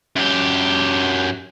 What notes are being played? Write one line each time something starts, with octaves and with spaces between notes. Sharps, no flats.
F#2 G4